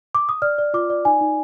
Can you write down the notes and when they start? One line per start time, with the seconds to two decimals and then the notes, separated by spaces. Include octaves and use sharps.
0.15 D6
0.29 D#6
0.42 D5 F6
0.58 D5
0.74 F4 D6
0.90 D5
1.05 D#4 G#5
1.21 D#4